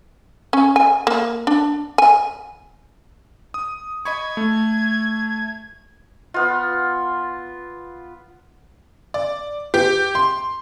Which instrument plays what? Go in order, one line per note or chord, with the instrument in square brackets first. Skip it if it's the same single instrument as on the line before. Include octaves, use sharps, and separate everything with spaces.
[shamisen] C#4
G#5
A#3
D4
G#5
[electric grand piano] D#6
[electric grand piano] D#5 B5 C#6 [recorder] G#6
[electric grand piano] A3
[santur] B3 F4
[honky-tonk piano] D5
G4
C6